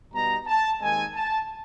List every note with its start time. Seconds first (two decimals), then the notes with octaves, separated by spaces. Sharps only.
0.13 B2 G3 B3 D#4 A#5
0.47 A5
0.81 D#2 D#3 G#3 C4 D#4 G#5
1.15 A5